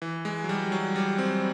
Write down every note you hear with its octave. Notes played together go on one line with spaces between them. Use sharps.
E3
G#3
F#3
G3
F#3
G3
C4